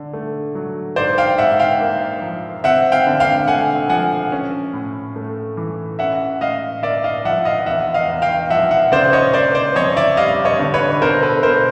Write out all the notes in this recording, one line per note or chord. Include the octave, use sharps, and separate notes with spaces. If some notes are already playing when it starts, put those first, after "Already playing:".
Already playing: D3
A3
F#3
G#2 C5 D5
F5 G5
G#2 E5 F#5
F5 G5
A#3
F3
C4 E5 F#5
F5 G5
D3
F5 G5
A3 F#5 G#5
F3 F#5 G#5
C#4
A2
A3
E3
C#4 E5 F#5
A2 D#5 F5
A#3 D5 E5
D#5 F5
F3 E5 F#5
D#5 F5
E2 E5 F#5
D#5 F5
E2
F5 G5
F3 E5 F#5
E5 F#5
C#3 C5 D5
C#5 D#5
A#3 C5 D5
C5 D5
F2 C#5 D#5
D5 E5
G3 D#5 F5
C#5 D#5
D3
B4 C#5
B2 A#4 C5
A4 B4
B2 A#4 C5